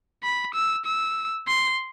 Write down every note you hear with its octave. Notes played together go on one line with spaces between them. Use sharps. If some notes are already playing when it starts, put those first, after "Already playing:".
B5
E6
E6
C6